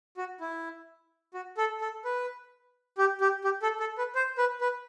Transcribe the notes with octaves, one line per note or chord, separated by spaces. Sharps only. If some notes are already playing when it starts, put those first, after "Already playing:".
F#4
E4
F#4
A4
A4
B4
G4
G4
G4
A4
A4
B4
C5
B4
B4